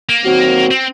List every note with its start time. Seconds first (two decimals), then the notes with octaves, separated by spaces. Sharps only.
0.09 A#3
0.24 D#3 F#3 C4 F#4
0.71 C4